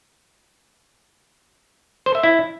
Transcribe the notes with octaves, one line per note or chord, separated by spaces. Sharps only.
C5
E5
E4